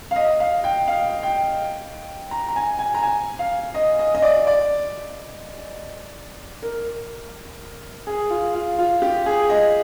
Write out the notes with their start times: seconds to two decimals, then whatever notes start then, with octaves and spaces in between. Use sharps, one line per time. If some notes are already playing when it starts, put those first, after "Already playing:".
0.11 F5
0.16 D#5
0.40 F5
0.64 G5
0.88 F5
1.23 G5
2.31 A#5
2.48 A#5
2.56 G#5
2.79 G#5
2.94 A#5
3.03 G#5
3.39 F5
3.75 D#5
3.99 D#5
4.15 D#5
4.22 D5
4.47 D5
6.62 A#4
8.07 G#4
8.30 F4
8.55 F4
8.79 F4
9.02 G4
9.26 G#4
9.50 D#5